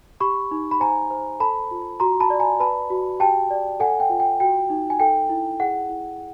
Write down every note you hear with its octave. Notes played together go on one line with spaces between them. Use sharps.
G4 B5 C#6
D#4
B5
C5 G#5 A#5
C5
A4 A5 B5
F4
F#4 A#5 C6
A5 B5
D5
G#5 A#5
B4 A5 B5
F#4
G4 G5 A5
D5
A4 F#5 G#5
G5
F4
G5
F#4 G5
D#4
G#5
A4 G5
E4
G#4 F#5
E4